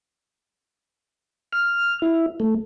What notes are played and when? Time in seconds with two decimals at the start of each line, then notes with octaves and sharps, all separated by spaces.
1.53 F6
2.02 E4
2.40 A3